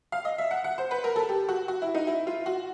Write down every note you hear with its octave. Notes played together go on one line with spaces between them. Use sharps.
F5
D#5
E5
F#5
F#5
C5
B4
A#4
A4
G4
F#4
F#4
E4
D#4
E4
F4
F#4